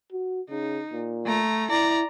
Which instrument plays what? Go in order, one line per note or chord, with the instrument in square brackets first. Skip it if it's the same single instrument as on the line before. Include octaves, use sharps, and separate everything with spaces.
[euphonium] F#4
[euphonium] C#3 [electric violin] D#4
[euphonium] A#2
[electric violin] A3 A#5
[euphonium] E4 [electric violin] D5 A#5